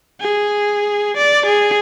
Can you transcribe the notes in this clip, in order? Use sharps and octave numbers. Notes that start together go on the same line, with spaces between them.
G#4
D5
G#4